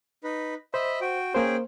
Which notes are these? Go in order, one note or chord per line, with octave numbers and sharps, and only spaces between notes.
D#4 B4
C5 D#5 E5 B5
F#4 G5
A#3 C#4 G#4 C5 G5